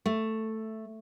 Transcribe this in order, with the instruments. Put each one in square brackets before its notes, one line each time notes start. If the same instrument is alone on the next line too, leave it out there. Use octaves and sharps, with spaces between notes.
[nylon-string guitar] A3